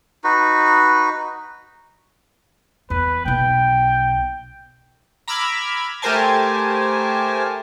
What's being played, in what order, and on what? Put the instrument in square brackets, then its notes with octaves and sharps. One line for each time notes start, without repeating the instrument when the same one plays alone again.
[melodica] D#4 F#4 B4
[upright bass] E2 [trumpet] B4
[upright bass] B1 B2 [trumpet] G5
[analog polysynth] A#5 B5 D6 E6 F6 G#6
A3 G4 A#4 C5 G#5 A5